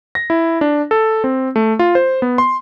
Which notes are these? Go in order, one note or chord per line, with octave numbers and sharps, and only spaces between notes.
A#6
E4
D4
A4
C4
A3
F4
C5
B3
C6